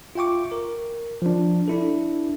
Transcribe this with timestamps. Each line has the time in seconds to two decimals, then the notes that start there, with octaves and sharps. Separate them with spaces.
0.15 F4 E5 G5 C#6 D6
0.52 A#4
1.22 F3 D4
1.68 D4 E4 A4